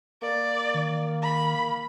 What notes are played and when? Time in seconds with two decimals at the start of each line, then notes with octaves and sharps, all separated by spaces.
0.22 A#3 D5
0.74 D#3
1.22 B5